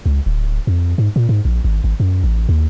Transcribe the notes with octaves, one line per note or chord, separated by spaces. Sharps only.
C#2
D1
F2
G#2
A#2
G#2
A#1
G#1
G#1
F#2
A1
D#2